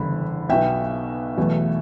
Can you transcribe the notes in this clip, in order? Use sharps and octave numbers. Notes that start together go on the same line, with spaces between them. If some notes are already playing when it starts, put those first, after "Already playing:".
Already playing: F#1 E2 D3 G3 B5
B1 B2 F#3 E5 G5
E2 B2 F#3 A3